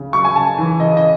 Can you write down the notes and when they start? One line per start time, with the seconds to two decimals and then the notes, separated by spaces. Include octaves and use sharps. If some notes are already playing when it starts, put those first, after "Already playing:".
Already playing: C#3
0.13 F#3 C#6
0.25 G#5
0.35 C#3 A5
0.58 E3
0.80 C#3 D#5
0.97 D#5